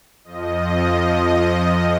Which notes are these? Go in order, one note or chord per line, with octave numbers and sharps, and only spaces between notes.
F2 F3 D#5